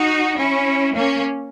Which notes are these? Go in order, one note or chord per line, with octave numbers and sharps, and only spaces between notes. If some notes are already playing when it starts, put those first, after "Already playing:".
Already playing: D#4 F#4
C#4 E4
A#3 C#4